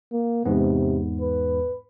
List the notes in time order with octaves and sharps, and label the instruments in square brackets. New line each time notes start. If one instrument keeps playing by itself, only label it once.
[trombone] A#3
[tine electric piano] E2 G#2 B3 [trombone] C3
[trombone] B4